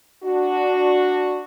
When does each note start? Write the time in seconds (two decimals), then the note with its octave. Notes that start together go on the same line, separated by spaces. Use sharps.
0.24 D4 F#4